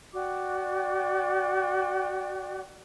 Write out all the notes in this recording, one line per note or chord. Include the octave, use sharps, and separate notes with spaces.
F#4 D5 G5 D6